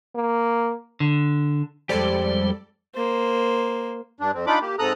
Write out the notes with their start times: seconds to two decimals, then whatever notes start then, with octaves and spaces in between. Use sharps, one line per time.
0.16 A#3
1.00 D3
1.89 F2 G3 G#3 G4 A4 C5 D5
2.95 A#3 C5
4.20 G2 D4
4.34 F2 C4
4.47 D4 D#4 F4 B5 D6
4.61 A#3 G4
4.79 G#2 C3 A4 A#5 D#6 F#6